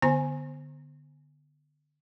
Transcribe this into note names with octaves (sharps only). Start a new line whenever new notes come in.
D3 B3 C5 G#5 A#5